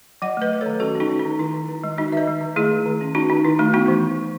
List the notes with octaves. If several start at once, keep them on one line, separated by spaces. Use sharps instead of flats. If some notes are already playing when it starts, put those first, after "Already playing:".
F#3 D#5 F#5
A3 B4 D#5
A3 B4
A4 C#5
D#3
C#4 F#4 A4
C#4
D#4 F#4
C#4
D#4
D#3
D#3 E4
D#3
D#3
G#3
G#3 D#4 F#4
D#3 B4 D#5 E5
G#3
D#3
A3 E4 G#4
D#3
D#3
C#4
C#4 D#4 F#4
D#3 D#4
D#3 E4
A3 D#4 F#4
B3 D#4 F#4
E3